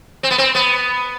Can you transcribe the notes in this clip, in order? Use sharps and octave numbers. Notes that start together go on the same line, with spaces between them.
C4
B3
C4
B3